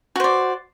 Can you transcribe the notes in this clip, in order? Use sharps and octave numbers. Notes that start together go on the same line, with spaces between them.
F#4 C5 D5